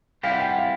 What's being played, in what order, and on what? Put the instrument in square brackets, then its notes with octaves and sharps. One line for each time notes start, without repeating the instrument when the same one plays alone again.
[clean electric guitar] G3 C4 E4 G4 [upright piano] F5
[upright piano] F#5
G5
F#5
F5